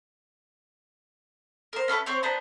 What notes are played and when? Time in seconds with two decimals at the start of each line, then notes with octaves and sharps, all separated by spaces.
1.73 A#4 C5
1.88 C#4 F4 A4 B4
2.06 C4 C5 C#5
2.23 B3 D4 C5 A#5